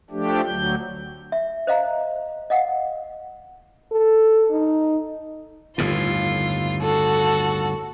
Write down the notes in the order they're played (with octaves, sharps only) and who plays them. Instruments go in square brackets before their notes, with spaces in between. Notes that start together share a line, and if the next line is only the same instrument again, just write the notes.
[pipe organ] F3 A3 D4 G4
D2 F#3 G6
[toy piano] E5
C5 D#5 F5 A#5
D#5 F5 F#5
[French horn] A4
D#4
[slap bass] G1 D#2 A2 [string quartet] F4
[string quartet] F#4 A4